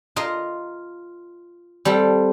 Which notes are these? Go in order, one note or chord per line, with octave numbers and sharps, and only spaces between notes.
F4 A#4 D#5 F5
G3 C4 A4